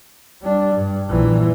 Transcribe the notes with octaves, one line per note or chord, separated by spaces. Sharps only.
G3 D4
G2
A#1 E3